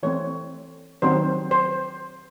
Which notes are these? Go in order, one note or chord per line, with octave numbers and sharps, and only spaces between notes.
E3 A3 C4 C#5
D#3 F#3 C4 C5
C5